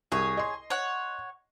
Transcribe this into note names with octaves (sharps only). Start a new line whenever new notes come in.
C2 G#4 C#5 G#5
D#5 C6
C#5 F#5